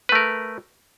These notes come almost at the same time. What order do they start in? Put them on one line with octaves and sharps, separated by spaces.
B4 A3 A#4